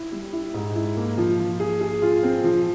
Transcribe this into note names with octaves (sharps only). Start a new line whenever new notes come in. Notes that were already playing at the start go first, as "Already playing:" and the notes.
Already playing: E4
G3
E4
G#2
E4
A#3
F3
F3
G#4
G#4
F4
C4
F3